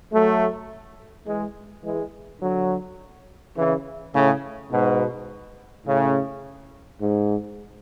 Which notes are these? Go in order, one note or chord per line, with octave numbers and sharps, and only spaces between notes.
F#3 A3
E3 G#3
E3 G#3
D3 F#3
C#3 E3
A2 C#3
G#2 B2
A2 C#3
G#2